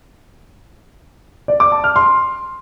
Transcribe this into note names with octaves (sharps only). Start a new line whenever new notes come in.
D5
D6
A5
F6
C6